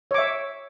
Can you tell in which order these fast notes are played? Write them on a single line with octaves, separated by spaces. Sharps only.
C#5 D6 E5